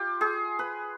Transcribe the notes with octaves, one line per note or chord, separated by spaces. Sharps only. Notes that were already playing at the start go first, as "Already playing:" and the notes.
Already playing: F4 G4
G#4
B4